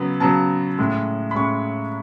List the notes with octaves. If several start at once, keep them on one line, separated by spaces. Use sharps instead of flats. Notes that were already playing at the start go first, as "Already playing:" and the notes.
Already playing: C#3 F#3 B3
C#3 F#3 B3 A5
A2 G#3 C#4
B5
A2 G#3 C#4 C#6